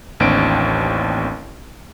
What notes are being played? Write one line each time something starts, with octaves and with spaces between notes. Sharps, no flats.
A1 D#2 C4 D4 D7